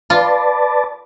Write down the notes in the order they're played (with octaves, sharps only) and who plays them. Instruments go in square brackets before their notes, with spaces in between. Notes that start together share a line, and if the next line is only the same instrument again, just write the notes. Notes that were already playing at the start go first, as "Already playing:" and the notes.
[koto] F4 [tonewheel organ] B4 D5 A5